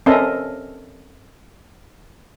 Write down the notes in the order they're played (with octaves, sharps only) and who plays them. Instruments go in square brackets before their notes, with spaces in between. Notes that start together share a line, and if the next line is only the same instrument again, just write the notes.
[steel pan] C4 C#4 A4 A#4 D#5 E5